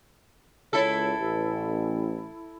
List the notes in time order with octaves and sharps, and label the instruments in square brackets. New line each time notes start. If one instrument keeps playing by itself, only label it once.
[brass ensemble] C#2 C#5 [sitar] E4 A4
[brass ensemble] A1